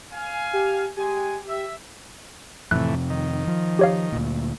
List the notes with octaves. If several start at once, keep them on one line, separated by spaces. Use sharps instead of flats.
F5 G#5
G4
G#3 G4 G#5
E5
F2 A2 C3 E3 F#6
D#3
F3
G4 C#5 F5
D2 A#2